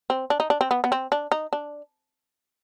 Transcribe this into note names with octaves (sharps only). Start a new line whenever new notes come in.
C4
D4
D#4
D4
C4
B3
B3
C4
D4
D#4
D4